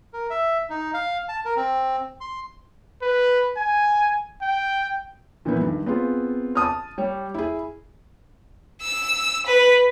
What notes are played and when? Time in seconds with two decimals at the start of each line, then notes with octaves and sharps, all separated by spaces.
0.13 A#4
0.30 E5
0.70 D#4
0.94 F5
1.29 A5
1.45 A#4
1.56 C4
2.21 C6
3.02 B4
3.57 G#5
4.42 G5
5.45 A#2 E3 F3 B3 E4
5.61 G2 D#3
5.86 B3 C4 F4 G#4
6.55 A5 D#6 F6
6.98 G3 C#5
7.34 E4 G#4
8.82 E6
9.47 B4